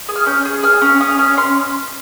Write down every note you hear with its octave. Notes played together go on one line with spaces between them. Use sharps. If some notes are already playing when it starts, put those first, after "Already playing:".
G#4
F6
C#4 G6
G#4
G#4 F6
C#4
C#4 D#6
C#4
C#4 C6